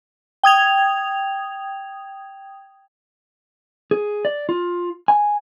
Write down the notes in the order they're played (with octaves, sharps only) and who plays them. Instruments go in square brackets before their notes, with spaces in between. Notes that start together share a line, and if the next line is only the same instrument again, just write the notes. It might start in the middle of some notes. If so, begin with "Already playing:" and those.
[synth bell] G5 D#6 G#6 F7
[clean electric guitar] G#4
D5
F4
G#5